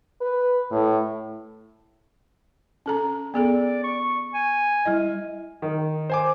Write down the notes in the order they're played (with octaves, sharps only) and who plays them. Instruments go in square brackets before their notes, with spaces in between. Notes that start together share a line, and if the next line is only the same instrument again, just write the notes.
[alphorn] B4
A2
[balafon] C#4 A4 A#5
[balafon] B3 G#4 A4 [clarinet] D5
[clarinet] C#6
G#5
[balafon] G3 E4 D#5
[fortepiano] D#3
[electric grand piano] C5 G#5 D6